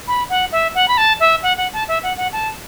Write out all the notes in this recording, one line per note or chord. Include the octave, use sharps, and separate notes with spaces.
B5
F#5
E5
F#5
B5
A5
E5
F#5
F#5
A5
E5
F#5
F#5
A5